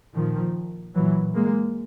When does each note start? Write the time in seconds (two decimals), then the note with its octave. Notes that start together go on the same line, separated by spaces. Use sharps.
0.14 A#2 D#3 F3
0.95 A#2 E3 F#3
1.35 G#3 A#3